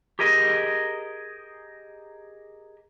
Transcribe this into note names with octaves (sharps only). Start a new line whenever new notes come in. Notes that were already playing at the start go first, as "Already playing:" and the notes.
G4 G#4 A#4 D#5